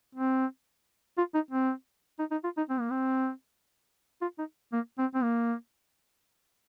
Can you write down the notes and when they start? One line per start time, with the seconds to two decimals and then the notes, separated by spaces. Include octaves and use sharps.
0.15 C4
1.17 F4
1.34 D#4
1.51 C4
2.19 D#4
2.31 D#4
2.44 F4
2.57 D#4
2.69 C4
2.80 A#3
2.90 C4
4.21 F4
4.38 D#4
4.72 A#3
4.98 C4
5.14 C4
5.23 A#3